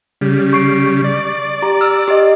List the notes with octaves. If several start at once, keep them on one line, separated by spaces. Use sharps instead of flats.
C#3 G3
C#6 C7 D7
D5
G4 A#5
E6 F6
G4 D#5